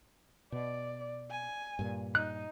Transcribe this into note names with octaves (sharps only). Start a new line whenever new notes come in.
B2 D5
G#5
G2 A#2
D#4 F#6